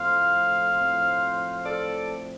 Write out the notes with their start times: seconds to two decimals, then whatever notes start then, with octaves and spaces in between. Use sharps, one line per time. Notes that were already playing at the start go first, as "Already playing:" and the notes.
Already playing: A2 F3 A3 C4 C5 F5
0.77 A2 F3 C4
1.65 A4 D5